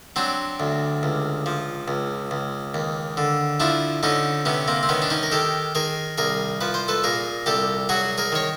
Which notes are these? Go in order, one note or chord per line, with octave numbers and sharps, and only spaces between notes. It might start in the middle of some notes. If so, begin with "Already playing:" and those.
F#3 C4 D4
D2
C#2
F3
C#2
C#2
D#2
D3
F3 D4 E4
D3 C#4 D#4
C3 B3 C#4
A#3 C4
C4
D#3 B3 C#4
D4
C#4 D#4
A#4
D#3 G4 A4
D#3 G#4 A#4
C2 G#4 A#4
F3 B4
C5
A4 B4
A#2 G#4 A#4
C2 G4 A4
F#3 F#4 G#4
G#4 A#4
D#3 C#5